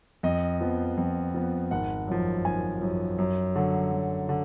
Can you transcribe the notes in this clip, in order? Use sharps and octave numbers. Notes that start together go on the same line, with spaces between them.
F2 D#5
F3 B3
F2
F3 B3
G#1 F#5
F#2 F3
G#1 G#5
F#2 F3
F#2
D3 F#3
F#2
D3